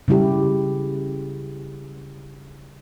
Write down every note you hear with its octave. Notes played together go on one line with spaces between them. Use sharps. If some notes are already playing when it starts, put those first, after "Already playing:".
C#3 G3 E4 G4